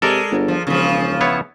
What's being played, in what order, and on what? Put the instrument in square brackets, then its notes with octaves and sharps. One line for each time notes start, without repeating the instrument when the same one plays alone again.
[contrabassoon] C3 [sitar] G#3 [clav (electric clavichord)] A4 A#4 D5
[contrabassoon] G1
[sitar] F3
[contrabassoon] E1 [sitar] C#3 F3
[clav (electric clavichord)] B3 E4 C#5